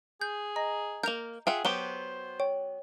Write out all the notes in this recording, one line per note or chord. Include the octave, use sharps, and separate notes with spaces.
G#4 G6
D#5 A#5
A#3 A#4 G6 F7
F4 G#4 E5 F#5 G5
F#3 B3 G4 C5 G7
C#5 G5